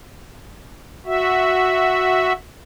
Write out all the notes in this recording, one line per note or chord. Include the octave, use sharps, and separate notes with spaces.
F#4 E5